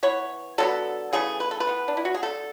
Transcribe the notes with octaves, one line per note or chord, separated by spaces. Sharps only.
E3 B3 C#5
D3 F#3 B3 A4
C#3 E3 A3 G#4
B4
A4
B4
E3 B3
D4
E4
F#4
G#4
D3 A3 A4